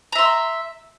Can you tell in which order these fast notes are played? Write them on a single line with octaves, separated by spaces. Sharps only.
A#5 E5 C6